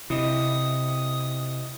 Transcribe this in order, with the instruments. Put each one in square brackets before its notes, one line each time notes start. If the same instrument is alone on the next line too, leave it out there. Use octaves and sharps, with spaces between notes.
[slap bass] C3 [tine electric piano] E4 D#5 [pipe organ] D#6